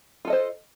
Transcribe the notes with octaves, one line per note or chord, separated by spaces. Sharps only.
F4 A4 C5 D#5